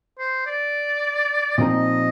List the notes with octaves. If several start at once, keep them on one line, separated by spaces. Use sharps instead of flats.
C5
D5
A#2 F3 C4 D#4 A#4 D#5